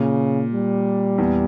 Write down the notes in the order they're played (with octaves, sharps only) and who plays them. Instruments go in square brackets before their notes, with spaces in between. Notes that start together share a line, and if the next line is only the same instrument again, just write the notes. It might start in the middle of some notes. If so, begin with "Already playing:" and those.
Already playing: [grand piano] A#2 [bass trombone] C#3
[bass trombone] G3
[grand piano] E2